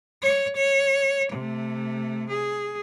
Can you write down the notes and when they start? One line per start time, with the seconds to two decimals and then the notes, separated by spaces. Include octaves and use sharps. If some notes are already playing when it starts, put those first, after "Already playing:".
0.23 C#5
0.57 C#5
1.32 C3 A3
2.29 G#4